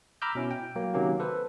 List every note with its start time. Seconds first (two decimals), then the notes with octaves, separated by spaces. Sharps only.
0.22 A#5 B5 D6 E6 F6 G6
0.35 B2 C#4 E4
0.51 G5
0.76 F#3 A#3
0.94 C3 D#3 F#3 A#3 C#4 G4
1.20 A4 B4 C5